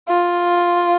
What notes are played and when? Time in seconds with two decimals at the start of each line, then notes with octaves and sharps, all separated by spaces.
0.08 F4